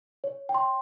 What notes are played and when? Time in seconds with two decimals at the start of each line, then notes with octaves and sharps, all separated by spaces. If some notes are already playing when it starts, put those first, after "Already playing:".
0.24 C#5
0.49 G5
0.54 C6